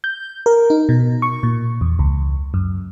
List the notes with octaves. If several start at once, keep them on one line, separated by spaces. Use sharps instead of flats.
G6
A#4
D#4
B2
C#6
A#2
E2
C#2
F#2